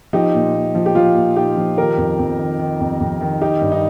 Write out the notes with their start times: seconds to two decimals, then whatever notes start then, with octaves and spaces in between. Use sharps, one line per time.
0.13 F3 D#4 G4
0.34 A#2
0.55 A#2
0.75 F3
0.86 G4
0.95 F3 F4
1.15 A#2
1.36 A#2 D#4 G4
1.57 F3
1.77 D#3 G4 A#4
1.97 F2
2.19 F2
2.39 D#3
2.59 D#3
2.80 F2
3.00 F2
3.21 D#3
3.41 D#3 D#4 G4
3.62 G2
3.72 D#4